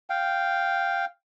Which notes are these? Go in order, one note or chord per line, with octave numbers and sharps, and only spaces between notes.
F5 G5